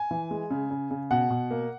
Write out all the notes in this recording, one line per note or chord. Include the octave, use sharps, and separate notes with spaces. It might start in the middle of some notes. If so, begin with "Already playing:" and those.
Already playing: G#5
E3
G#3
C#3
C#3
C#3
B2 F#5
B2
A#3